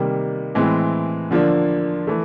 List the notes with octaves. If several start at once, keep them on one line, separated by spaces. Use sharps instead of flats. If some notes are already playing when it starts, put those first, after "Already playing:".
Already playing: C3 D#3 G3 A#3
A2 E3 G#3 C4
D3 F3 A#3 D4
E3 A3